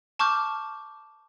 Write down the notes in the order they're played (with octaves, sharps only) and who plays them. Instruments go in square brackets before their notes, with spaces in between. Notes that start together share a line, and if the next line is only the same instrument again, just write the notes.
[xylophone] A5 C#6 D6 F6 G6